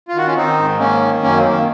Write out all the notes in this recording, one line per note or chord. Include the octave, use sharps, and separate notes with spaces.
F4
D#3 F#4
C#4 F4
D#3 C4 D#4
G#2
D#3 A#3 C#4
D#3
F#2 A#3 C#4
C4
D#3 A#3